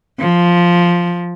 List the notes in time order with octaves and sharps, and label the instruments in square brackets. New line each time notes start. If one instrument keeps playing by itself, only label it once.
[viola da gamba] F3